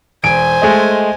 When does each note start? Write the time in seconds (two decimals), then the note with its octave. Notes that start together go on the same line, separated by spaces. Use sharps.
0.23 E1 C5 G#5 D7
0.62 G#3 A3 D#5